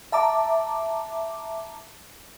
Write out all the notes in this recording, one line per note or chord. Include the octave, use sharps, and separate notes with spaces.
E5 A5 A#5 D6